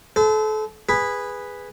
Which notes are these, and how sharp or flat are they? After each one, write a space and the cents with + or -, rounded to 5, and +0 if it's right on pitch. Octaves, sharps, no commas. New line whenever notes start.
A4 -30 C5 -45
G#4 -15 B4 +0 B5 +0